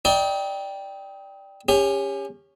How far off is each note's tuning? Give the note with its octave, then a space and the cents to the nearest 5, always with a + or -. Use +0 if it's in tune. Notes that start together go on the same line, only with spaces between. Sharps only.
D#4 +35 D5 +0 G5 +0
C#4 +0 G4 +35